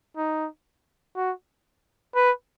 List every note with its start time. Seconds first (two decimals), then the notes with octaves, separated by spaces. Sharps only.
0.17 D#4
1.16 F#4
2.16 B4